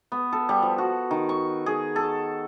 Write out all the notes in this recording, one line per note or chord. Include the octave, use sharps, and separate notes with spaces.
B3
A4
G3
F3
F#4
D#3
C#6
G#4
A4